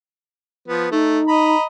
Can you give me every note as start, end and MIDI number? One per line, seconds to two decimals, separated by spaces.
0.68 0.88 53
0.68 0.88 59
0.91 1.20 57
0.91 1.55 63
1.28 1.64 75
1.28 1.64 82
1.28 1.64 83